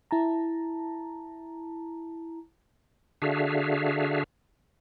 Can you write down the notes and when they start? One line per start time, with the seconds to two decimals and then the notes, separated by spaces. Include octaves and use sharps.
0.11 E4 A5 A#5
3.22 D3 D4 F#4 G#4 E5 F5